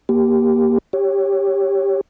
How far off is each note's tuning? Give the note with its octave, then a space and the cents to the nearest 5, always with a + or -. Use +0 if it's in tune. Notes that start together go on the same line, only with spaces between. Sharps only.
A#3 +15 G4 +0
G4 +5 C#5 +0